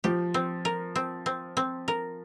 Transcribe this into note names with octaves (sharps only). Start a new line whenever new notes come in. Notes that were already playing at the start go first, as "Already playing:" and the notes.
F3 G4
C4
A#4
C4
C4
C4
A#4